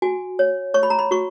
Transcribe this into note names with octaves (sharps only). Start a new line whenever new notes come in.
F#4 G#5
C#5
C#5 C#6
B5
A#5
B5
F#4 C#6